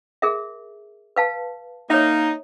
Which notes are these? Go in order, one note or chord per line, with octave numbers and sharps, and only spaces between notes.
G#4 A#4 E5
B4 F5 A5
A#3 D#4 C#5 E5